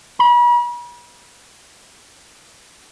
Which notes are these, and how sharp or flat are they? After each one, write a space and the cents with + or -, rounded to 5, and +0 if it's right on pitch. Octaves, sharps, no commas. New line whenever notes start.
B5 -40